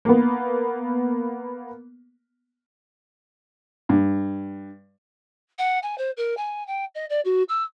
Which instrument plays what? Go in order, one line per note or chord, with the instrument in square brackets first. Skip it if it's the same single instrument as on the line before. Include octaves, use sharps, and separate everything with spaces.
[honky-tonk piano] A#3 B3
[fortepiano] G2
[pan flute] F#5
G#5
C5
A#4
G#5
G5
D#5
D5
F#4
E6